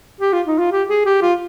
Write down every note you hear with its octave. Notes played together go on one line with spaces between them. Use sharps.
G4
F4
D#4
F4
G4
G#4
G4
F4